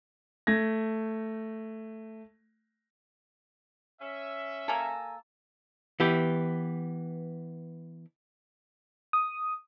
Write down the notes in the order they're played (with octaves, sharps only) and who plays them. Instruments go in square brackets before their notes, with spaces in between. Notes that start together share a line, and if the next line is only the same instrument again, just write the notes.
[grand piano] A3 G#6 A#6
[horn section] C#4 E5
[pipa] A#3 A4 [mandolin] G#5 A#5
[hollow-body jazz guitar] E3 B3 G4
[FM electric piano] D#6